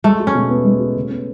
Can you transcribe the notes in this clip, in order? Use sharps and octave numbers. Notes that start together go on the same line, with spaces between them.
G#3 A3
F#4
C#4
B2
B3
G#3
F#4
C#3
B3